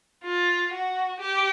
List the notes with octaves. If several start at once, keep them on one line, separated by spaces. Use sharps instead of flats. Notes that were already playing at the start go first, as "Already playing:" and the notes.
F4
F#4
G4